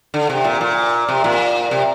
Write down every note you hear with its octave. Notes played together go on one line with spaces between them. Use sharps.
D3
C3
A#2
A#2
C3
A#2
C3